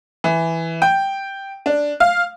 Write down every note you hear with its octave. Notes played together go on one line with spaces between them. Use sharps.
E3
G5
D4
F5